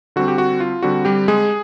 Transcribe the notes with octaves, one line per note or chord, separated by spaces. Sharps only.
D3 G3 C4 F#4
G4
F#4
F4
D3 G3 C4 F#4
G3 G4
G#3 G#4